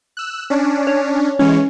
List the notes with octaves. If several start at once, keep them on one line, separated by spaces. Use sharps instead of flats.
E6 F#6
C#4 D4
C#5
E3 G#3 C#4 C#5